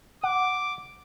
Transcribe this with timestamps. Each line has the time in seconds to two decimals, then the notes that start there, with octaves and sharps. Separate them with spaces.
0.23 F#5 D6